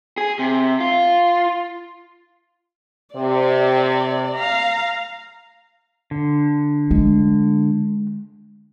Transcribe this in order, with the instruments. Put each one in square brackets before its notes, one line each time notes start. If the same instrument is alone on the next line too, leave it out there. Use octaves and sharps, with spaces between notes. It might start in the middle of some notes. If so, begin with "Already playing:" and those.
[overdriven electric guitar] G#4
C3
F4
[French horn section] C3 [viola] D5
[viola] F5 A#5
[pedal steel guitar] D3
[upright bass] G#3